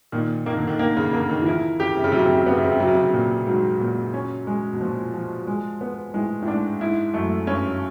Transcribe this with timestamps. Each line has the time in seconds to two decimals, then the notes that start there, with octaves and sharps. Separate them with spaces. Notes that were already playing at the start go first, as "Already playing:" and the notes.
0.12 A#2 D#3
0.46 D#3 A#3
0.57 D3
0.67 D#3
0.79 D#3 A#3
0.97 C#3
1.13 D3 A#3
1.29 D#3
1.41 E3
1.46 F3 E4
1.80 C#3 G4
1.97 C3
2.04 C#3
2.12 C3 F#3
2.19 C#3
2.26 C3
2.34 C#3
2.41 C3
2.46 C#3 B3
2.57 C3
2.65 C#3
2.72 C3
2.80 C#3 F#3
2.87 C3
2.95 C#3
3.02 C3
3.13 A#2
3.46 G#2 F#3
3.80 A#2
4.14 C#4
4.47 G#3
4.73 B2
4.81 A#2 F3
5.14 F3
5.47 G#3
5.81 B3
6.14 A2 G#3
6.42 A2
6.47 G#2 D4
6.81 G#2 E4
7.14 F#2 A3
7.47 G2 C#4